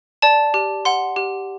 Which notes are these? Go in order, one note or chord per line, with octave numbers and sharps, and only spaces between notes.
D5 A5
G4
F#5 C6
G4